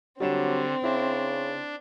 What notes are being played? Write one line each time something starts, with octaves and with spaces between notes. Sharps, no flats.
D3 F#3 G3 C4 D4 E7
C#3 D4 E4